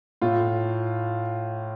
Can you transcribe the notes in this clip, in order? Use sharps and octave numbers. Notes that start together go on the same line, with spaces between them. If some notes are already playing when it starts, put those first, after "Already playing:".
A2 F4